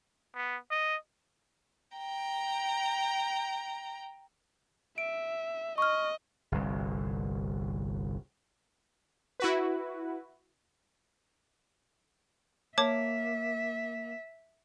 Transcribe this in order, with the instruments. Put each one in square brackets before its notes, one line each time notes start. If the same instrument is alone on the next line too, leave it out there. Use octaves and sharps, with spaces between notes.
[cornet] B3
D#5
[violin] G5 A#5
[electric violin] E5 [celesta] D7
[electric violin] D#5 [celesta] C#6 F6
[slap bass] G1 C2
[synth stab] E4 F#4 B4
[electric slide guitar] A#3 [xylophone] C#5 A5 D6 [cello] E5